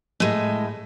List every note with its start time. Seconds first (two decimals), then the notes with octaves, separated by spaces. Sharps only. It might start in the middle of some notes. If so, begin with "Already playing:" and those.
0.20 A2 G#3